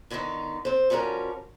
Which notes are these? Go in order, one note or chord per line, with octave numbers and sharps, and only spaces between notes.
A2 D3 D#3 B3 D#4
C4 C5
F3 G3 C#4 F#4 A#4